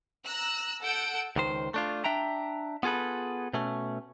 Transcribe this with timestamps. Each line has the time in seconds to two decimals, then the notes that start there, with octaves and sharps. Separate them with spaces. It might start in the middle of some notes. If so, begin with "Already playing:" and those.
0.24 A#5 E6 F#6
0.81 A4 F#5 E6 G6 D7
1.36 C#2 D#3 C5
1.74 A3 D4 F4
2.04 D4 E5 G5 A#5
2.83 B3 F4 G#4 A4 B4
3.53 B2 A3 C#4